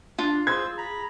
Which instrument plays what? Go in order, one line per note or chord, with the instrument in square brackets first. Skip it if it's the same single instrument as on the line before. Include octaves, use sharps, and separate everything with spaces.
[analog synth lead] D4 [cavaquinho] F4
[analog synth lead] G#4 [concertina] C5 E6 [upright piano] G#6
[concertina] A#5 B5